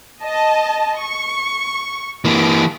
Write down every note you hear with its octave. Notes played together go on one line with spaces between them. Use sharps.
D#5 A5
C#6
E3 A#3 D7